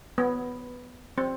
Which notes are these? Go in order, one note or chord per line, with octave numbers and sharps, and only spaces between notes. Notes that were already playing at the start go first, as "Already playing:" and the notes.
B3
C4